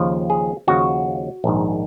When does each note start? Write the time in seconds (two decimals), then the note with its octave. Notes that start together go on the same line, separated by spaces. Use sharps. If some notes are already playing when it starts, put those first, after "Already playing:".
Already playing: D#2 C#3 F3
0.30 G#4
0.67 D#2 C#3 F3 F#4
1.44 A#1 G#2 D#3